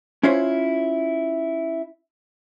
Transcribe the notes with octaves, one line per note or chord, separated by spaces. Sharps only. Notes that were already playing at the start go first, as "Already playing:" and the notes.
C#4 E4 F4 C5 C#5